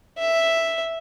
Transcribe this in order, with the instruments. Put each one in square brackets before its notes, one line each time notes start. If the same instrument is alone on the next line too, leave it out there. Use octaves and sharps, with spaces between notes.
[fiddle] E5